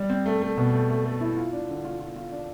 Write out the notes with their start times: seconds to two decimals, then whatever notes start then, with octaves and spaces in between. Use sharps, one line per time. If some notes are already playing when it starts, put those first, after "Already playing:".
Already playing: G3
0.10 C4
0.26 A3
0.42 A3
0.57 B2
0.73 A3
0.89 A3
1.05 A3
1.21 E4
1.37 F4
1.52 D4
1.69 D3
1.85 F4
2.00 F4
2.16 F4
2.32 D4